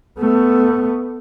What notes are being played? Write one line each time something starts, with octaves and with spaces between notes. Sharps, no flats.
A3 B3